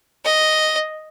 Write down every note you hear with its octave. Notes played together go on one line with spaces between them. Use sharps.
D#5